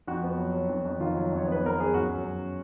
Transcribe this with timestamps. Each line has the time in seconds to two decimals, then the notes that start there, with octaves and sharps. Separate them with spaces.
0.07 F2 F#4
0.24 B3
0.38 F#3
0.54 F#3
0.69 F2
0.85 F2
1.00 D#3 F4
1.16 F#3
1.32 F2
1.38 C#5
1.47 B3 B4
1.62 B3 A#4
1.78 B3 G#4
1.94 F#2 F#4
2.09 F#2
2.24 F#2